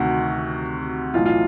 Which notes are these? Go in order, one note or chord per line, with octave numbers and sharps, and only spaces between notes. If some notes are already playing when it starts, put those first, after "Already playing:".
Already playing: D2 C3 D#3 F#4
B1 A2 E3 F4
F4